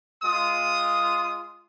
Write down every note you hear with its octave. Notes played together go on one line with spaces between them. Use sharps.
G#3 F4 D#6